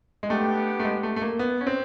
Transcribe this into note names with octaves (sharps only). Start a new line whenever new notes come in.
G#3
A3 B3 D4 G4
A3
G#3
A3
A3
A#3
B3
C#4
C4